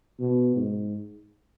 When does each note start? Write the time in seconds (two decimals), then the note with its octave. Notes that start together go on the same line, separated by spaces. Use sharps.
0.20 B2
0.57 G#2